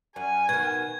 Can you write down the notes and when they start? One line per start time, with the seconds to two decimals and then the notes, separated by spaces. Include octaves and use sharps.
0.16 F#2 G#5
0.49 B2 D#3 G#6